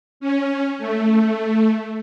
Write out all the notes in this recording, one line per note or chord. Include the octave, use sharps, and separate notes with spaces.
C#4
A3